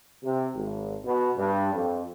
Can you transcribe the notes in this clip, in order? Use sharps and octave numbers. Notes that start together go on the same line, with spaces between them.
C3
G#1
B2
G2
F2